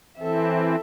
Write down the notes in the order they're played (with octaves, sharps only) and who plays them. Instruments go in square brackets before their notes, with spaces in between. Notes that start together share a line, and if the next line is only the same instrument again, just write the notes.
[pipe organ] E3 C4 [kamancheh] A4 E5